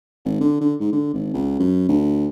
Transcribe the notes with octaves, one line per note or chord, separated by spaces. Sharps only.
G#1
D3
D3
G#2
D3
G#1
C#2
F#2
D2